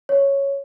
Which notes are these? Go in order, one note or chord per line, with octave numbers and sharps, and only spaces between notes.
C#5